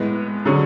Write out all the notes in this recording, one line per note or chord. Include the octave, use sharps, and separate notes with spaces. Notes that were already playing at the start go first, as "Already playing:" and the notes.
Already playing: A2 G#3 B3
D3 F#3 C#4 G#4